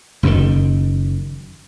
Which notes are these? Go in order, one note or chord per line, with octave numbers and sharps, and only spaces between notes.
F#1 F#2 A#2 D#3